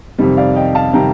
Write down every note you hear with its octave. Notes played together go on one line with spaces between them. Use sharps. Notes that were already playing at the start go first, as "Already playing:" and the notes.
F2 C3 D#3 G3
D5 F5
D#5 G5
F5 A5
C3 D#3 G3 G5 A#5